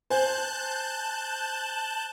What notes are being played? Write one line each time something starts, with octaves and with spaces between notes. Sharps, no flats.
C5 G#5 A5 F#6 G6